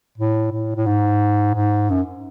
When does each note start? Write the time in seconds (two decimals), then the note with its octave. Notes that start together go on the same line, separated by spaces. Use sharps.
0.18 A2
0.52 A2
0.76 A2
0.86 G#2
1.54 G#2
1.90 F#2